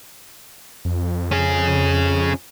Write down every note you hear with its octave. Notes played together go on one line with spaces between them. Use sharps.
F2
C#4 G#4